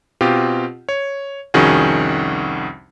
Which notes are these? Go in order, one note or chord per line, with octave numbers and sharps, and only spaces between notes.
B2 C4 F4 G4
C#5
C2 F2 D#3 C#4 F#4 G#4